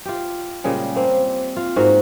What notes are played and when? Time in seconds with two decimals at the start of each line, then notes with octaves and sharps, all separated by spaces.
0.05 F4 G4
0.64 A#2 C#3 G3 G#3
0.96 A#3 C4
1.56 F4
1.76 G#2 A#3 F#4